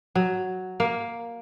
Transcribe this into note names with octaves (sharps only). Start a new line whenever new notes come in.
F#3
A#3